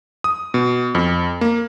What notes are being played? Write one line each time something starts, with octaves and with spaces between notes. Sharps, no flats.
D#6
B2
F2
A#3